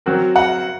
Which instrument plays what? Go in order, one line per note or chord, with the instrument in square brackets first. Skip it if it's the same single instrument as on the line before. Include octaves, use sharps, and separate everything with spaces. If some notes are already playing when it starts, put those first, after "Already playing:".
[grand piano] F#3 C4 F#4 A#4
[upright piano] F#5